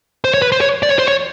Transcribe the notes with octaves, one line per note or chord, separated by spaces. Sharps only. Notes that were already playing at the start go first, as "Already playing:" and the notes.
C5
C#5
B4
C5
C#5
D5
C#5
C5
C#5